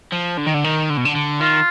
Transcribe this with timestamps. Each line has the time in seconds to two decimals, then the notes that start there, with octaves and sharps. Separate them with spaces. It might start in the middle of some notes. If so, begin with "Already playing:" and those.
0.12 F3
0.38 D3
0.47 D#3
0.54 D3
0.64 D#3
0.90 D3
0.97 B2
1.05 D3
1.15 D3
1.41 D#3 F4